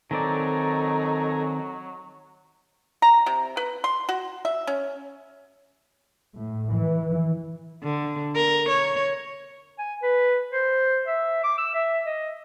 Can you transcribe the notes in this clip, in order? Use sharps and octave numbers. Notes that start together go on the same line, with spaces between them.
D#3 F#3 C4 D#4 A4 D5 G#5 A#5
A#5
C3
B4
C6
F#4
E5
C#4
A2
E3
D3
A#4
C#5
G#5
B4
C5
E5
D6
E6
E5
D#5